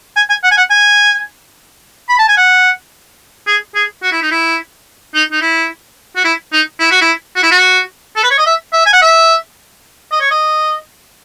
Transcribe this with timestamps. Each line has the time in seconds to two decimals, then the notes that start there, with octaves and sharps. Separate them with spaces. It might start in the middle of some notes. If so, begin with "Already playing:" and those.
0.16 G#5
0.30 G#5
0.44 F#5
0.51 G#5
0.57 F#5
0.70 G#5
2.09 B5
2.19 A5
2.28 G#5
2.37 F#5
3.47 G#4
3.75 G#4
4.03 F#4
4.12 E4
4.23 D#4
4.31 E4
5.14 D#4
5.32 D#4
5.42 E4
6.16 F#4
6.24 E4
6.53 D#4
6.80 E4
6.91 F#4
7.01 E4
7.36 F#4
7.43 E4
7.51 F#4
8.16 A4
8.23 B4
8.31 C#5
8.38 D#5
8.46 E5
8.73 E5
8.86 G#5
8.93 F#5
9.02 E5
10.12 D#5
10.21 C#5
10.31 D#5